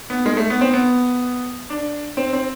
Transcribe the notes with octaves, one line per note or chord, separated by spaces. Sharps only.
B3
G#3
A3
B3
C4
B3
D4
C4
C4